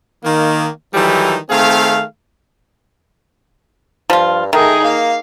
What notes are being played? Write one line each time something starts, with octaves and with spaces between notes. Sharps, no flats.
D#3 A#3
D#3 E3 F#3 G3 D#4 A4
D#3 A3 C4 G#4 F5
G2 F3 F4
D#3 A3 D#4 G#4 A#4
A#3 F5